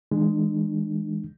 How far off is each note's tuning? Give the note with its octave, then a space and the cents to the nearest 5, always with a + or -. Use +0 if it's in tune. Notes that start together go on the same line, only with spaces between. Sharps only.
E3 -35 G#3 +0 D4 +40